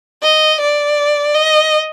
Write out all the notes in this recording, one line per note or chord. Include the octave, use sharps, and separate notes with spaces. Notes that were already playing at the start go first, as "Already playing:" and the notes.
D#5
D5
D#5